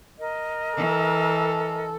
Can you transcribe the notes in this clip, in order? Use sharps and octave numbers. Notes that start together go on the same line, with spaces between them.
A#4 D#5
E3 A4